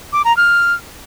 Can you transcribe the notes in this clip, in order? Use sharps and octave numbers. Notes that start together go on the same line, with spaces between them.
D6
A#5
F6